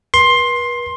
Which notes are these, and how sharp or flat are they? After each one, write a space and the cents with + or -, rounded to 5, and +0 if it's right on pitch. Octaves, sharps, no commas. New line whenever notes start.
B4 -40 C6 +15